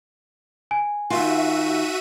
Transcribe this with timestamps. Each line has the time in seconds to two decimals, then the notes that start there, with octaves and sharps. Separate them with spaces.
0.71 G#5
1.10 D#3 F4 F#4 E5 D#7